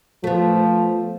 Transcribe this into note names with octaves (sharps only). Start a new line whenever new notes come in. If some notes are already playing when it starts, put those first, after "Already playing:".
F3 A3 B3